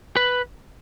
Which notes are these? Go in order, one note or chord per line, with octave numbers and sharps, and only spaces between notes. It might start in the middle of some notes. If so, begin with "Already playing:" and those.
B4